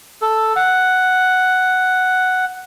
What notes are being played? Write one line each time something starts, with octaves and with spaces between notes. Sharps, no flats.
A4
F#5